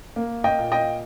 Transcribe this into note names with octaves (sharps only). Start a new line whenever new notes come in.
A#3
D#5 G5
A#2
D#5 G5